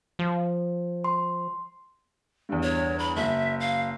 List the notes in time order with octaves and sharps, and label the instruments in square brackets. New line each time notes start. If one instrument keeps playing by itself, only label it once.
[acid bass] F3
[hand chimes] C6
[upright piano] E2 G2
[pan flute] C#5
B5
[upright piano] F#1 [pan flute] E5
[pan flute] F5